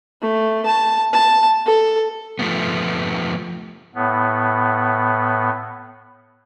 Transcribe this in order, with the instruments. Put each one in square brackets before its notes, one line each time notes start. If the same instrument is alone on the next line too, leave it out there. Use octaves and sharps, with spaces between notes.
[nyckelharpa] A3
A5
A5
A4
[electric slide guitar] F3 A3 B3
[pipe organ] A2 B3